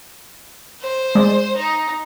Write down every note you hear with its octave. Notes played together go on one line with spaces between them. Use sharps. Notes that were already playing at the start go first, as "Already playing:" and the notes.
C5
G#3 D5
D#4